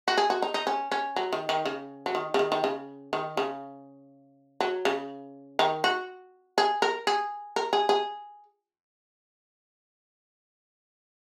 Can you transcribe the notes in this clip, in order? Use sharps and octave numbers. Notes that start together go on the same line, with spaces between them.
F#4
G#4
F#4
D#4
D#4
C#4
C#4
F#3
D#3
D#3
C#3
F#3
D#3
C#3
D#3
D#3
C#3
D#3
C#3
F#3
C#3
D#3
F#4
G#4
A#4
G#4
A#4
G#4
G#4